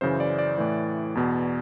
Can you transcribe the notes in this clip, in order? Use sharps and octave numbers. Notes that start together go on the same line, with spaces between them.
F#2 C#3 E3 C5
D5
D5
A2 E3
E2 B2